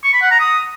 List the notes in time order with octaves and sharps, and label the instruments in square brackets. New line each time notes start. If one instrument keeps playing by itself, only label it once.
[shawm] C#6
B5
F#5
A#5
D#6